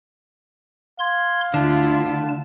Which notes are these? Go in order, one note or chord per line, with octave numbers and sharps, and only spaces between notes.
F5 C6 G#6
D2 D3 E4 F4 A5